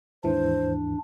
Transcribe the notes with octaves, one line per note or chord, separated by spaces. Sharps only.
D#2 G#2 E3 D4 C5